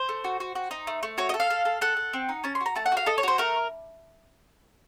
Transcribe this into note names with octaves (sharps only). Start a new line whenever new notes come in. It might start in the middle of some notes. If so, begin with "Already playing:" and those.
Already playing: C5
A3
F#4
F#4
F#4
D#4
A3
A3
F#4 C#5
D#5
A4
F5
A4
A4
A4 F#5
A4
C4
D#4
C#4 A5
C6
F#4
A#5
A3 A5
F#5
F#4 F5
A4 D#5
C#5
F#4 C5
A3 A#4